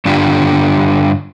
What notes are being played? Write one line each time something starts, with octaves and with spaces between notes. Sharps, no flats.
G2 D3 D4 F4 G4